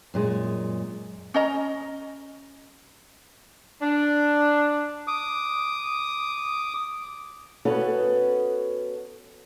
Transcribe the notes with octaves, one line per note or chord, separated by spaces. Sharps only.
F#2 A#2 G#3
C#4 D#5 A#5
D4
D6 D#6
B3 C#4 F#4 A4 B4